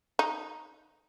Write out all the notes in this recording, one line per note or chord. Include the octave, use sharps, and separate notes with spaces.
D#4